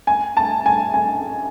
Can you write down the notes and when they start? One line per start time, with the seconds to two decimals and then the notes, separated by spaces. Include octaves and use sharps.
0.07 G#5
0.37 A5
0.66 G#5
0.94 G#5